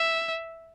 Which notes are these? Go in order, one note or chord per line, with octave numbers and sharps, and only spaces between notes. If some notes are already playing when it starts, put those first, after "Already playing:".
Already playing: E5